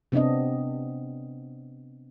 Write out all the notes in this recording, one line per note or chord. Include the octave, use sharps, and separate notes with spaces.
C3 B3 C4 D4 D#5